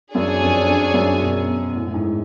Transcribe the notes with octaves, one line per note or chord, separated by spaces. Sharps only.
F#2 D4 G#4 C#5 G#5
F2
F2
F#2
B2
B2
A2
A2
G#2